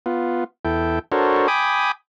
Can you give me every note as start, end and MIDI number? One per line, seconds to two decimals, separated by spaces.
0.06 0.44 59
0.06 0.44 65
0.65 0.99 40
0.65 0.99 64
0.65 0.99 69
0.65 0.99 79
1.12 1.48 62
1.12 1.48 66
1.12 1.48 69
1.12 1.48 70
1.12 1.48 72
1.12 1.48 73
1.48 1.91 79
1.48 1.91 80
1.48 1.91 83
1.48 1.91 86
1.48 1.91 87